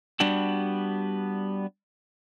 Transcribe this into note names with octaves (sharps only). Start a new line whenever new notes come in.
G3 B3 D4 F#4 G4